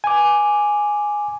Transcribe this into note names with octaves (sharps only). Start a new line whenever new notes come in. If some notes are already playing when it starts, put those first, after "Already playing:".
G#5 D6